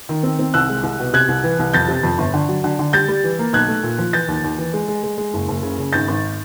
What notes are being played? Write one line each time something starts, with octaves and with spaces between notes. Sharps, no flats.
D#3
C4
C4
C2 E6 F#6
G#3
C2
B2
C3 F#6 G#6
C2
E3
C2
F2 G6 A6
C3
F2
G1
D3
F#3
D3
D3
G3 G6 A6
G3
E3
A#3
B1 F#6 G#6
A3
A#2
F3
E3 G6 A6
D#2
D#2
E3
G#3
G#3
G#3
G#3
F#1
F#1
C#3
C#3
G#1 G6 A6
G#1